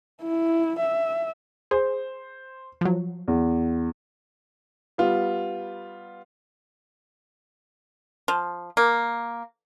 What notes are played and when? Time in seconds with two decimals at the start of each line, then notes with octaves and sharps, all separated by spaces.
0.23 E4
0.80 E5
1.71 G#4 C5
2.81 F3 F#3
3.28 E2
4.98 G3 B3 F4
8.28 F3
8.77 A#3